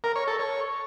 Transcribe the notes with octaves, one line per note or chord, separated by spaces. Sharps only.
A#4
C#5
A4
C#5